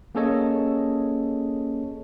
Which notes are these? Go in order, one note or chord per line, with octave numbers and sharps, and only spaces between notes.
A#3 C#4 G#4 A4 C#5 D#5